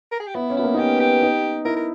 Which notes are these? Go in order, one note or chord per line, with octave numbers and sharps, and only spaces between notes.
A#4
G#4
G4
B3 E4
C#4
B3 E4
A#3
D#4
C#4 G4
G4
D#4
E4 A#4
A#4